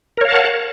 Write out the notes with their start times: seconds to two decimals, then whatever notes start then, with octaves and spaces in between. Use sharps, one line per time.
0.17 A#4
0.21 C#5
0.25 F5
0.29 A5
0.32 F#5